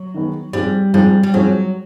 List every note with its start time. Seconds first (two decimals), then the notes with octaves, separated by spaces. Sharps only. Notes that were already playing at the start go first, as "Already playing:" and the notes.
Already playing: F#3
0.14 D#3 G#3 B3 D#4
0.53 G#2 F3 G3 G#3 C4
0.94 G#2 F3 G3 G#3 C4
1.23 G3
1.34 G#2 F3 F#3 G#3 C4